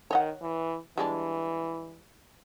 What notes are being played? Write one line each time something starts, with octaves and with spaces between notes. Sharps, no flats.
D#3 C#5 D#5 F#5
E3
E3 G3 G#3 D4